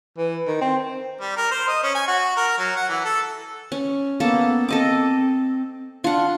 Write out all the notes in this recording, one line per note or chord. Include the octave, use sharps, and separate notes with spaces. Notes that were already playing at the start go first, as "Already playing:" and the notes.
E3
D#3
C4
G3
A#4
C5
D#5
C#4
G#5
F#4
A#4
F#3
F#5
E3
A4
C#4
A#3 B3 A4
C4 A4 D#5 D6
D4 F4 F#5